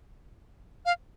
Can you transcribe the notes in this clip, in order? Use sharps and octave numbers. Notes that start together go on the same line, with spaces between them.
F5